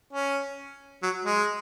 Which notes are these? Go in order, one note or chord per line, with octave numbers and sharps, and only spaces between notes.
C#4
F#3
G#3